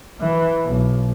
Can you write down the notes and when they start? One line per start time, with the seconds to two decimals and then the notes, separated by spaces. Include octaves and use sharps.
0.20 E3
0.65 B1